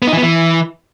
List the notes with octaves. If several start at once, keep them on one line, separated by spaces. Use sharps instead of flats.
B3
D#4
E3
B3
E3